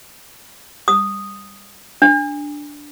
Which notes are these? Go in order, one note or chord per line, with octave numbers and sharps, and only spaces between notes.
D#6
D4